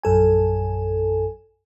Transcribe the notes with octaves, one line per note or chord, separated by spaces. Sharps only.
A#1 F#2 A4 G#5